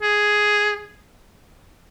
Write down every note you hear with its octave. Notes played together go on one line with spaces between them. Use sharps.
G#4